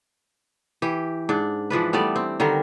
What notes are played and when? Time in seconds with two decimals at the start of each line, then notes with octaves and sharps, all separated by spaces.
0.82 E3 G4
1.29 G#2 D4
1.70 E3 F3 D4 B4
1.93 G3 A3 B3 D5
2.16 C4
2.40 D3 D#3 G3 A#4